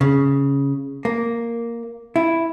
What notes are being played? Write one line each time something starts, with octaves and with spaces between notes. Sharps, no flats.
C#3
A#3
E4